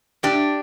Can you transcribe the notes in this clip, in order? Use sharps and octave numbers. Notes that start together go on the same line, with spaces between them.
A2 D4 G4